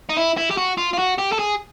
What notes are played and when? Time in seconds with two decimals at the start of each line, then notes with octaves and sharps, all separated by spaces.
0.09 D#4
0.17 E4
0.37 E4
0.51 G4
0.57 F#4
0.78 F4
0.93 F4
0.99 F#4
1.19 G4
1.33 A4
1.39 G#4